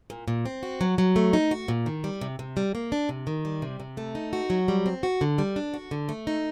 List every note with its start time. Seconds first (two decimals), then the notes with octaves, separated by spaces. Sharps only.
0.10 A#2
0.28 A#2
0.45 C4
0.63 F#4
0.81 F#3
0.98 F#3
1.16 A3
1.33 D#4
1.51 F#4
1.68 A#2
1.86 D#3
2.04 G3
2.21 C3
2.39 C3
2.57 G3
2.75 A#3
2.92 D4
3.09 C3
3.27 D#3
3.45 G3
3.62 C3
3.80 C3
3.97 A3
4.15 D#4
4.33 F#4
4.50 F#3
4.68 G3
4.86 C4
5.03 F#4
5.21 D3
5.38 G3
5.56 D4
5.74 F#4
5.91 D3
6.09 A3
6.27 D#4